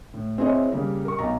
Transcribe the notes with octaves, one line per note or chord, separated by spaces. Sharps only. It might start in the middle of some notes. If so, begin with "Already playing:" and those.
A2
C4 E4 G#4 C#5 D#5 E5
C#3 G3 A#3 A#4
A#4 C#6
B1 A#5